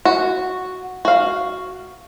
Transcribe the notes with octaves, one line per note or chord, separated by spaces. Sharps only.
F#4
F#4 F5